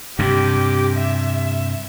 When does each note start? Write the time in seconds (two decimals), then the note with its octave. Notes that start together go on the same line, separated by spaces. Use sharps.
0.19 G2 C3 G4
0.96 E5